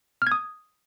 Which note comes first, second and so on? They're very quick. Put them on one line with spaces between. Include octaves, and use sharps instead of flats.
F6 G#6 D#6